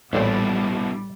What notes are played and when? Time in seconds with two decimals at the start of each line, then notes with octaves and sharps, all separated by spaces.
0.13 A1 A#2 G3 B3 D4 E4 C5